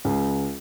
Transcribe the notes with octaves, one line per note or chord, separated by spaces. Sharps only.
C#2